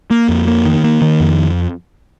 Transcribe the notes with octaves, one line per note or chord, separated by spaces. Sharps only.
A#3
F2
A#3
D#3
A#3
D#3
F2